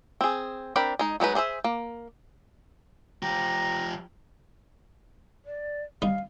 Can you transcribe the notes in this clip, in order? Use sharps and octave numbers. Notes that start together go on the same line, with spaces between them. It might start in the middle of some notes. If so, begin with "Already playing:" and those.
C4 G#4
C4 D4 A#4 G5 B5
G#3 D#4
F#3 G#3 D#4 B4
D4 G#4 C5 E5
A#3
F3 G4 A#5
D5
G3 D#4 F5